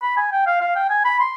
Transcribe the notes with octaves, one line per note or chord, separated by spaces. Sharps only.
B5
G#5
G5
F5
F5
G5
G#5
B5
C6